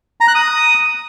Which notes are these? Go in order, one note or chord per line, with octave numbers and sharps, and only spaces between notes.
A#5
F#6
D#6